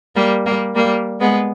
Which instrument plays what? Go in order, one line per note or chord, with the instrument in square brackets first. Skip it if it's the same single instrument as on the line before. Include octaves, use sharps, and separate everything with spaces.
[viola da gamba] G3 A#3
G3 A#3
G3 A#3
G#3 B3